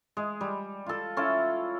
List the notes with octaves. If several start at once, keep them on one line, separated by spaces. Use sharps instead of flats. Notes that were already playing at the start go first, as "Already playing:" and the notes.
G#3 G#4
G3
F4 A4
C#4 E4 F4 A4